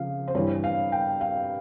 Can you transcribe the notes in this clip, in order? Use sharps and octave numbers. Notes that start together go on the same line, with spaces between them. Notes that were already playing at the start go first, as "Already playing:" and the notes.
Already playing: C#3 F3 F5
C5
G2 E3 C#5
F5
G5
F5